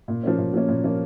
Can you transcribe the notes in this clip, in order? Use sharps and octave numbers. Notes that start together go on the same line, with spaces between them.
A#2
F3 A#3 C#4
A#2
F3 A#3 C#4
A#2
F3 A#3 C#4